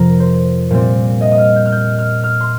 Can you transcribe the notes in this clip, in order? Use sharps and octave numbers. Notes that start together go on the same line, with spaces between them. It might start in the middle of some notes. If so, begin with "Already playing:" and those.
Already playing: F2 C3 F3 A#4
C5
A#2 G3 C4
D#5
D#6
F6
G6
F6
G6
F6
F6
C6